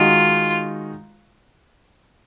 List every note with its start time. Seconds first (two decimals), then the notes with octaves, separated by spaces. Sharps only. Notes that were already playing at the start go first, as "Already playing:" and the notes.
Already playing: D#3 G#3 D#4 F4 F#4